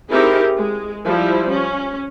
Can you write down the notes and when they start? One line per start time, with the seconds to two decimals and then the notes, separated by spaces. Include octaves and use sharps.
0.11 C4 D#4 E4 G4 G#4 A#4
0.57 G#3
1.05 F3 G3 E4
1.50 C#4